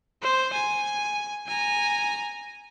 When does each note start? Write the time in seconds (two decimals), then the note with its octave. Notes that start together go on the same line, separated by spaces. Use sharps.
0.22 C5
0.53 G#5
1.47 G#5 A#5